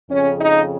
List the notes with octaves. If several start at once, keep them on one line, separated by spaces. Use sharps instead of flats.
F2 C#3 C#4
D#4